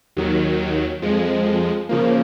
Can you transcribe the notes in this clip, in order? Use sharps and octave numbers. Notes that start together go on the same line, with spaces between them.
D#2 D#3 F#3
F2 F3 G#3
C#3 F3 A#3